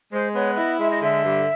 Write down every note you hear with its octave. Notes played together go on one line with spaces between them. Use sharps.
G#3 C5
B3 C#5
E4 D#5
G#3 E5
D#5
D3 E5
G2